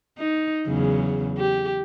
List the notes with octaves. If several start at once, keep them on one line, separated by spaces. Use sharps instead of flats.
D#4
E2 C#3 F#3
G4